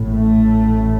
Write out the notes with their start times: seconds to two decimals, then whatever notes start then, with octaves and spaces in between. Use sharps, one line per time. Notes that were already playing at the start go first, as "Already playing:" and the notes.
Already playing: A1 A2
0.10 A3